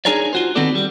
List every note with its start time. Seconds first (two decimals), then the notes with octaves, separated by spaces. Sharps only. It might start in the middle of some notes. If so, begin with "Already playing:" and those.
0.05 D4 D#4 G#4 A#4 C#5 D5
0.33 F4 F#4 C5
0.55 D#3 B3 C4 D#4 A4 D5
0.75 G3